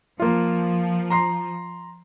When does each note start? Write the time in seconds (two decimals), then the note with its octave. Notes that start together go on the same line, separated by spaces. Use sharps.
0.20 F3 A#3 F4
1.10 A#5 C6 C7